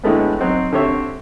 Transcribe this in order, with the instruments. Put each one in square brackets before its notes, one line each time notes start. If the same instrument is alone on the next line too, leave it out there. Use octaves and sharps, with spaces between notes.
[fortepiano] A2 D3 G#3 A3 B3
F#3 C4 D#4 F#4
D3 C4 G4 C#5 E5